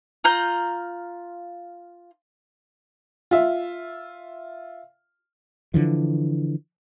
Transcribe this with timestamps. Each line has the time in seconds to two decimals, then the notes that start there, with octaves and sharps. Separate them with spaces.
0.24 F4 A#5 G6
3.31 F4 E5
5.74 D3 E3 F3